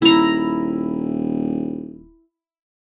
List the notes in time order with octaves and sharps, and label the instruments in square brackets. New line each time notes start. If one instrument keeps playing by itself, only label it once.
[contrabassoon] D#1 [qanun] E4 A#5